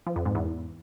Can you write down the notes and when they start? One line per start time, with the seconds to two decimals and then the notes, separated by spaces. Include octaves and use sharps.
0.07 F3
0.16 F2
0.25 G#2
0.35 E2